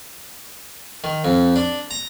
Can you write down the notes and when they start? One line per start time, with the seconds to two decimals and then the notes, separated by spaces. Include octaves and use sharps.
1.04 D#3
1.24 F2
1.56 D4
1.91 A#5